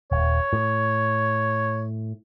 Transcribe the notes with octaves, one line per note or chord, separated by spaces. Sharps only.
D#1 C#5
A2